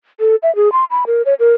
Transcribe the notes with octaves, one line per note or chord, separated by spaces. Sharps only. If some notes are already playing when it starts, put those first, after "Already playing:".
A4
E5
G#4
C6
B5
A#4
C#5
A#4